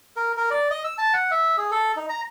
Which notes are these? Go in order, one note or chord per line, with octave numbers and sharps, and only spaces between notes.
A#4
A#4
D5
D#5
E6
A5
F#5
E5
G#4
A4
D#4
A#5